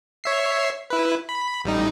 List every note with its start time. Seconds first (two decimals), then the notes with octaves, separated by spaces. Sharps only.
0.24 C#5 E5 C7
0.90 E4 B4
1.29 B5
1.65 A1 G3 D#4